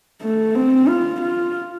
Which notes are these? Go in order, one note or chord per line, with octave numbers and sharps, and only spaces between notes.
A3
C4
F4
F4